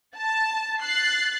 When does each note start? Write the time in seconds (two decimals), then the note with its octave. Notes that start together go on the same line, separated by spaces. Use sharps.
0.17 A5
0.82 F#6 A6 C7